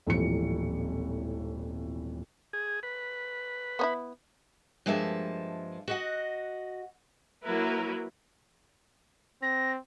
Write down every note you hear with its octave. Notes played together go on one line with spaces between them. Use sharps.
D#1 G#1 A2 E3 F3 C#7
G#4
B4
B3 C#4 E4
G2 F3 G#3 A#3 E5 A5
F#4 D#5 F#5
F#3 A#3 E4 A#4 B4
C4 A#6